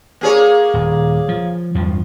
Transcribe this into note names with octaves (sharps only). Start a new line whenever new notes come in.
A#3 G#4 C#5
D#1
F3
E2 G2 F3